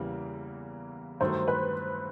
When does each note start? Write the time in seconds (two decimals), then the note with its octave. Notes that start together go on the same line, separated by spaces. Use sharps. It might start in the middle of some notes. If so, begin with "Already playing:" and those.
Already playing: E2 C#3 E3 G3 A#3
1.20 G2 D#3 F#3 A3 C5
1.48 B4